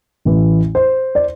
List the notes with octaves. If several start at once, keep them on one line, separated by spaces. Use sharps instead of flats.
A1 A2 E3
C5
D5